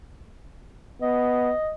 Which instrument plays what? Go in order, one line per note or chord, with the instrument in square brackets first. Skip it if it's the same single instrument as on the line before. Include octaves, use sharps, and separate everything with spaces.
[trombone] B3 [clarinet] D#5